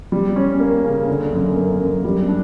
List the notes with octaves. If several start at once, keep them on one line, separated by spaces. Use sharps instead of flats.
G3
C#4
A#3
C#3
D3
F#2
A#3
F#2
G3
D4